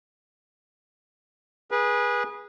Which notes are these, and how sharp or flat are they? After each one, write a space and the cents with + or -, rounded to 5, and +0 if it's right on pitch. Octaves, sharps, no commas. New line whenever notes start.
G#4 -10 B4 -25